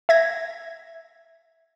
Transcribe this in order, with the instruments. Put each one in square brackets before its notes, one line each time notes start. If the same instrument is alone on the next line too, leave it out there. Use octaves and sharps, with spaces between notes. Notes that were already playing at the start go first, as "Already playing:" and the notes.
[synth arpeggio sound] E5 G#6 A#6